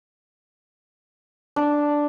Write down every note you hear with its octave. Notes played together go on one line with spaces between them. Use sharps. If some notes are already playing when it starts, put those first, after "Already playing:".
D4